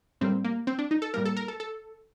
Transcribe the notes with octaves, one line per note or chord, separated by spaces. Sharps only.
A2 G3 A#3 C4
A#3
C4
D4
D#4
A4
A2 G3 A#3 A#4
A4
A#4
A4
A4